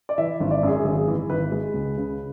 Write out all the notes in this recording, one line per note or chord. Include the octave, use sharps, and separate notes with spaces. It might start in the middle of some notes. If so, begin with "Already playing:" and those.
D5
E3 E5
G#1
D5
F#2 G#4
G#1 G#4
E3
G#1 B4
G#3
C#2
C#3